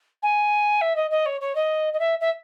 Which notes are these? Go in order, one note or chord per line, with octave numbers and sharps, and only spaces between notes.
G#5
E5
D#5
D#5
C#5
C#5
D#5
D#5
E5
E5